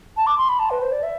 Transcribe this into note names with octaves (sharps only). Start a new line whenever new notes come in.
A5
D6
C6
B5
A5
B4
C5
D5
E5